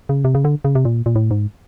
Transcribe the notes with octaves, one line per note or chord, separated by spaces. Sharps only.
C#3
C3
C#3
D3
C#3
C3
A#2
A#2
A2
G#2